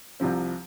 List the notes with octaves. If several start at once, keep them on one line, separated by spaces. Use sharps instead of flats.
C2 C3 F3 C4